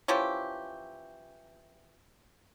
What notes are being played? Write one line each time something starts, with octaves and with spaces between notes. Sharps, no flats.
E3 F3 C#4 G4